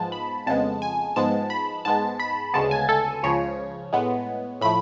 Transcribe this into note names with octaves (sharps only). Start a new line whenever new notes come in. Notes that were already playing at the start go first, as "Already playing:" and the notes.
Already playing: G#2 F3 G#3 B3 A5
B5
F2 C#3 G#3 B3 A5
G#5
G#2 F3 G#3 B3 A5
B5
G#2 G#3 B3 A5
B5
D2 C#3 G#3 B3 A5
G#5
A4
C#2 C#3 F3 C#5
A2 G#3 B3
A2 F3 A3 B5